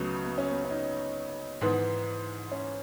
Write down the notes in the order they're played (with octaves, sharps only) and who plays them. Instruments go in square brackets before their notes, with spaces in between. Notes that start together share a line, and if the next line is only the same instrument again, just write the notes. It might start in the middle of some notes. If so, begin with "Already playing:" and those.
Already playing: [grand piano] C#2 C#3 F#3 A3 [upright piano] B3
[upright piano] B3
C#4
B3
C#4
D#4
[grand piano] G#2 E3 B3
[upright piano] C#4